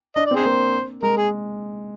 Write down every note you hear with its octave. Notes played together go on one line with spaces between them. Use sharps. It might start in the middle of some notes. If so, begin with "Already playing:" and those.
D4 D#5
D5
C4
G#4 C5
A#3
G#3 A#4
G#4